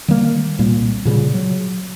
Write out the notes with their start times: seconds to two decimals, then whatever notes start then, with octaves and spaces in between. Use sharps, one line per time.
0.08 D#3 G3 A#3
0.59 C2 A#2 G3 A#3
1.05 A#2 C#3 F3 G3
1.34 F#3